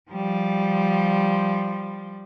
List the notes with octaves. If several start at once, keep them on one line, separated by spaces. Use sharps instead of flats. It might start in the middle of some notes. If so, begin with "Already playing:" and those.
F3 G3